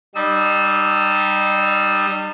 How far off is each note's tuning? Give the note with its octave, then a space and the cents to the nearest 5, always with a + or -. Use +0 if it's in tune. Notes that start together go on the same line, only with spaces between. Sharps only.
G3 -5 D#4 -40 E6 -35